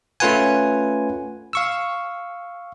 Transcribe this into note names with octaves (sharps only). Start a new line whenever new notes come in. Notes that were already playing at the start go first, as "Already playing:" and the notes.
A3 C#4 F4 B4 F#5 G#5
F5 C#6 E6